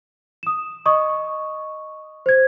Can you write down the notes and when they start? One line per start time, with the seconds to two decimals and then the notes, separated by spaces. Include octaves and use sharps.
0.43 D#6 E7
0.86 D#5 C#6 D#6
2.26 C5 G#6